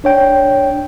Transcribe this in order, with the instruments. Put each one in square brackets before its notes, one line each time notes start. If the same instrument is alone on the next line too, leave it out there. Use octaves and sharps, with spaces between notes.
[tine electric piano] D4 C#5 G5